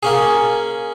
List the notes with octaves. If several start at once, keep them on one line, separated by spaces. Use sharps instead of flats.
A#3 C#4 G#4